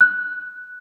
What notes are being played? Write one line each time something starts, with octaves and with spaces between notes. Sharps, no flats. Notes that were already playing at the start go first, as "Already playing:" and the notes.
F#6